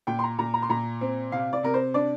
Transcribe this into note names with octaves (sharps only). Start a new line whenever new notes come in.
A#2 G5
C6
A#5
A#2 A#5
A#5
C6
A#2 A#5
C4
C3 F5
D5
C3 A#4
C5
D4 D5